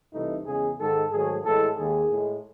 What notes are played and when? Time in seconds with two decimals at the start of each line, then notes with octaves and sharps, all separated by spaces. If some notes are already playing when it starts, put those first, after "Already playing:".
0.13 C2 C3 E3 A3 D#4
0.46 E2 C#3 G#3 G#4
0.78 G#2 D#3 G#3 A4
1.11 G#2 D#3 F#3 A3 G#4
1.44 A2 E3 G#3 A4
1.76 D#2 D#3 G#3 G#4
2.09 A2 G#3